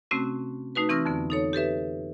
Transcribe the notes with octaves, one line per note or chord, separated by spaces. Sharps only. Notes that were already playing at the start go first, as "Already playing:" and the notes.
C3 A3 C4 C#4 F#4
A3 D#4 F#4 B4
E3 C4 C#6 E6 F6 A#6
F2 D3 B3
D#4 A4 C#5
G4 A4 B4 E5